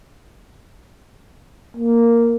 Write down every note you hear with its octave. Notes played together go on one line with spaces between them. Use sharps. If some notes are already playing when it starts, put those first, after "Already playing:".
A#3